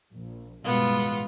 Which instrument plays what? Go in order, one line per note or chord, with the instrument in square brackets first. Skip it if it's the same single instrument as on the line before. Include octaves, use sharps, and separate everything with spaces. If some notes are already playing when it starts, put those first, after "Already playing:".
[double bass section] A#1
[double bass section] A1 G2 B2 [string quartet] G#3 B3 F4